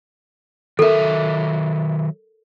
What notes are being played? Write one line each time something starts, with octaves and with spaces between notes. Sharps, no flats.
D#3 F#3 A4 A#4 E5